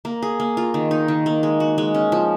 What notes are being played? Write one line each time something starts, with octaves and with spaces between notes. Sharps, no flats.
A#3
G#4
A#3
F4
D#3
D#4
D#3
A#3
G#3
F#4
G#3
C#4
F3